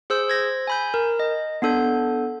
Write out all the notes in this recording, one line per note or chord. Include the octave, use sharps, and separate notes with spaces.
G#4 C5 E6 G6
C5 G#6 A#6
G#5 B5 G6
A#4
D#5
B3 D4 A4 G6